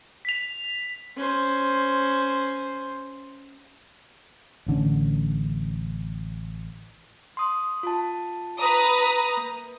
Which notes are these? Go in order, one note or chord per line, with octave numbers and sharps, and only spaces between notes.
B6 F7
C#4 C5
A1 D3 C#4
C6 D#6
F4 A5
B4 A#5 D#6
A#3